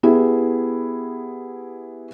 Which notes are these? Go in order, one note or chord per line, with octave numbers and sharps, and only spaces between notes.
B3 E4 G4 G#4